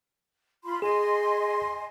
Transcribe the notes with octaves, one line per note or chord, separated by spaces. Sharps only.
F4 B5 C6
G#4 D#5 G#5 C6